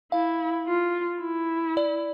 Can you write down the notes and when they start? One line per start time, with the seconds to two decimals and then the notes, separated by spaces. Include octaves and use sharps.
0.12 E4 F5
0.67 F4
1.22 E4
1.77 D5